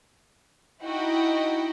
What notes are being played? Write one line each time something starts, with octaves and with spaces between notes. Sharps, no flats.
D#4 E4 F#4 D#5 G5